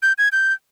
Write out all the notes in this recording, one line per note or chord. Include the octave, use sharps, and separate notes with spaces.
G6
G#6
G6